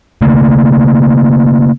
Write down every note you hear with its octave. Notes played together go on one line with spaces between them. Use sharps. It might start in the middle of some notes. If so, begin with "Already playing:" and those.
C#3 A3 A#3